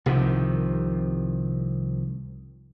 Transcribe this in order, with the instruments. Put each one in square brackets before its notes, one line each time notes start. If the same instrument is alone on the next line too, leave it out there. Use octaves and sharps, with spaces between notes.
[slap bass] C2 C3 D#3 F3